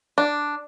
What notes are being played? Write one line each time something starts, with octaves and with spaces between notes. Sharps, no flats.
D4